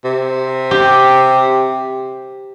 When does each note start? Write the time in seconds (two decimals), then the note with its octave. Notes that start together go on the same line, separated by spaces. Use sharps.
0.05 C3
0.71 G4